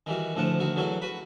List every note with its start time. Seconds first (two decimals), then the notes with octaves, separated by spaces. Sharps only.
0.06 D#3 E3 G3 F#4
0.36 D2 A2 F3 F#5 A5
0.60 D2 D#3 F#4
0.76 E2 F#3 A3 F#4 F5
1.02 F#4 B4 B5